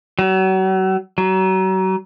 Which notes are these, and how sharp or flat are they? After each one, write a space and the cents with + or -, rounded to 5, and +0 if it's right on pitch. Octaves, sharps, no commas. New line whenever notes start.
F#3 +35
F#3 +35